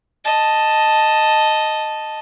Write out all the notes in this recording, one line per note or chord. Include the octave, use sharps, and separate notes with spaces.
D#5 A5